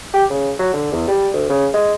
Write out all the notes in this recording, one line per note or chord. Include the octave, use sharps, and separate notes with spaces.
G4
C#3
F#3
D3
E2
G3
D2
C#3
G#3